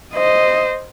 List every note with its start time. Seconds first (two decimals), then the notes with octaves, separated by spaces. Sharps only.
0.14 C5 D#5